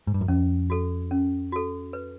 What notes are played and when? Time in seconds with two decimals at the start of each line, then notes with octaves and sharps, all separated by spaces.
0.07 G#2
0.14 G2
0.21 F#2
0.28 F2 C#4
0.70 F#4 A4
1.11 C#4
1.52 F#4 A4
1.93 B4